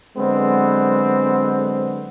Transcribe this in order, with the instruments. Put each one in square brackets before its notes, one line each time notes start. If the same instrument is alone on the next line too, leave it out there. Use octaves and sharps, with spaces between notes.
[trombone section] D3 F#3 G#3 B3 C4